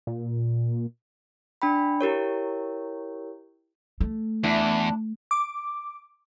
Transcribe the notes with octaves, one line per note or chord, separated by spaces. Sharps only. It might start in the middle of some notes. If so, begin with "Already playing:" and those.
A#2
D4 G5 B5
E4 G4 A#4 C#5
A3
E2 D4 E4
D6